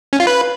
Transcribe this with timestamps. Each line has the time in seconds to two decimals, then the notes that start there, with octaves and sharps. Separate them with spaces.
0.13 C#4
0.20 F4
0.27 B4